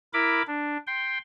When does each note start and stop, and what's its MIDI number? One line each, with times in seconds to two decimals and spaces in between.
0.13 0.42 64
0.13 0.42 70
0.13 0.42 83
0.13 0.42 86
0.47 0.77 62
0.87 1.18 79
0.87 1.18 84